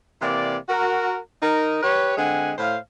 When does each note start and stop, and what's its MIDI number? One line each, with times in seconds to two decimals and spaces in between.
0.22 0.57 48
0.22 0.57 52
0.22 0.57 58
0.22 0.57 74
0.68 1.17 66
0.68 1.17 70
1.41 1.79 63
1.41 1.79 70
1.83 2.14 67
1.83 2.14 71
1.83 2.14 73
2.17 2.53 50
2.17 2.53 56
2.17 2.53 60
2.17 2.53 78
2.17 2.53 80
2.58 2.77 45
2.58 2.77 72
2.58 2.77 77